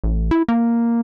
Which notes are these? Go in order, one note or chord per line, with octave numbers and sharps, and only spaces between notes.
A1
E4
A#3